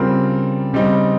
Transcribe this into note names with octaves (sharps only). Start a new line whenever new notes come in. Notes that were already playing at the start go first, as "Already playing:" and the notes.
Already playing: C#3 G3 C4 F4 A#4
C#3 G3 C4 D#4